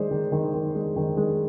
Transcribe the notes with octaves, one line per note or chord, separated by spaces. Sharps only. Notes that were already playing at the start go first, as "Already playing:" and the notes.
Already playing: D#3 G#3 C5 D5
D#3
D#3
D#3
G#3
D#3
G#3